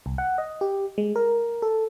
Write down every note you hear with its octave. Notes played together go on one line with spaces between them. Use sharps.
C2
F#5
D#5
G4
G#3
A#4
A4